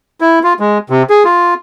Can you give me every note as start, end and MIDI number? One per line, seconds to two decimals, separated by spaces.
0.21 0.39 64
0.43 0.53 65
0.60 0.78 56
0.90 1.03 48
1.10 1.23 68
1.25 1.54 65